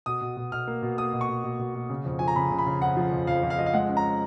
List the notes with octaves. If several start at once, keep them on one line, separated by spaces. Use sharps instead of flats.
B2 D#6
B2
B2
B2 F6
A#3
B2
A#3 D#6
B2
C#6
B2
B2
B2
B2
C#3
F2
F3 G#5
A#5
C#3 B5
C#3
B5
C#3
F2 F#5
F3
F2
F2 F5
F2
F5
F3 D#5
F5
G#3 F#5
C#4
A#5